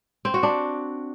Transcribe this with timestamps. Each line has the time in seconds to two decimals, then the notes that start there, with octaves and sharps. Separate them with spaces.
0.25 C4
0.34 F#4
0.43 D4